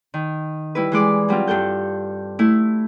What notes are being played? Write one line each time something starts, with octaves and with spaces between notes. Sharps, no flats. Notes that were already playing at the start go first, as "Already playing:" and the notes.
D#3
G3 E4 B4
E3 G#3 D5 D6
F#3 G3 C4 F4
G2 G4 A4 G6
A3 E4